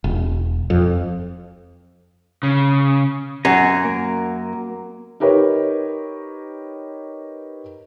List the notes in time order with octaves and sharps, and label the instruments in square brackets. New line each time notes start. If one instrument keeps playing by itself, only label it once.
[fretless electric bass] E1
F2
[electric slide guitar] C#3
[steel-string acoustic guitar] F#2 [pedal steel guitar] G#5 A#5
[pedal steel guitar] A#3
[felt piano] D#4 G4 A#4 B4 C#5